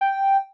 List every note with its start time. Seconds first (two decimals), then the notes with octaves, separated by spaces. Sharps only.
0.01 G5